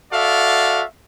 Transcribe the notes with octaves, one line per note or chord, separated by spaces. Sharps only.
F#4 A4 D5 E5 F5